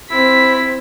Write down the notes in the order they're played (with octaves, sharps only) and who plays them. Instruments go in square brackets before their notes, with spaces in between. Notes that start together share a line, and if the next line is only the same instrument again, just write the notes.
[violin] C4 [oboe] E4 [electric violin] B6